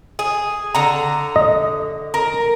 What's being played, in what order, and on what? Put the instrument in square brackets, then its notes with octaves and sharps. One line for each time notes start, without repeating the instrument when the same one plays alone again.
[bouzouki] G#4
D3 A#5
[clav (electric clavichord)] D#5
[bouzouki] A#4